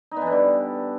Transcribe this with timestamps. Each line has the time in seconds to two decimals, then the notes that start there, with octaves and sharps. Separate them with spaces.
0.11 D#4
0.17 B3
0.22 E3
0.27 D3
0.32 G3